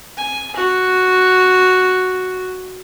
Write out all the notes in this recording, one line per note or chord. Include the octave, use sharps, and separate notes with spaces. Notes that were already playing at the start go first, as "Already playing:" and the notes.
G#5
F#4